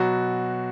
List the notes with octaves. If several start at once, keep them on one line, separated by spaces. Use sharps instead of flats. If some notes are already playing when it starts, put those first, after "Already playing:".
Already playing: B2 F#3 F#4